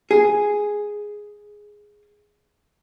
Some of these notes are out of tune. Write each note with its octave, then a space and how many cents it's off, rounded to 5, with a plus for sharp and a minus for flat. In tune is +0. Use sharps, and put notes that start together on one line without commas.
G#4 +0